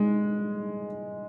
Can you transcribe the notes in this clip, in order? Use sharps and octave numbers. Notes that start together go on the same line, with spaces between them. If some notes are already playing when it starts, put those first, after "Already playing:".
Already playing: G#3